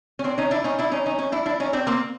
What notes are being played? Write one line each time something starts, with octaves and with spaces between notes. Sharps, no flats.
C#4
C4 D4
C#4 D#4
D4 E4
C#4 D#4
D4 E4
C#4 D#4
C#4 D#4
C#4 D#4
D4 E4
D4 E4
C#4 D#4
C4 D4
A#3 C4